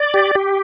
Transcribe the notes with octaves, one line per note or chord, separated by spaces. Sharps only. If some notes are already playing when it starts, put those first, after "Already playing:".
Already playing: D5
G4
G4